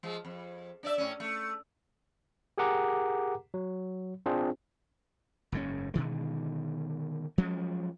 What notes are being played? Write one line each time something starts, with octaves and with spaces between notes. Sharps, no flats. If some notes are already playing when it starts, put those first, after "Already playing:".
F3 G#3
F2
D4 D5 E5
A2 C#4
A3
G4 G#4 A#4 F#5 A#5 D6
F#3
C4 D4 F4 G#4 C5
F#1 G#2 C#3 C#4
B2 D3 D#3 G#3
F3 F#3 G#3 C#4